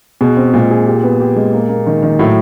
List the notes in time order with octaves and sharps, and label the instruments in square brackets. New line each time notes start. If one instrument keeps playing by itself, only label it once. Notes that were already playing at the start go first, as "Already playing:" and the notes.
[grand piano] B2 [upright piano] G#4
[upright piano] C4
[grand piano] A#2 [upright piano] G#3
[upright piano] G#4
G4
B3
G4
G#3
A#3
A#3
D#3
D#3
[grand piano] A2 [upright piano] F#3